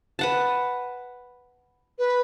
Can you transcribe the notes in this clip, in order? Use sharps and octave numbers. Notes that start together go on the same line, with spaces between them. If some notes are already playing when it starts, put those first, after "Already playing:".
B4 F#5 A5
B4